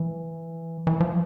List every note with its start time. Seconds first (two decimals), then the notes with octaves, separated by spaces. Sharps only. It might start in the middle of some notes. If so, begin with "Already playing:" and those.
Already playing: E3
0.87 E3
1.00 F3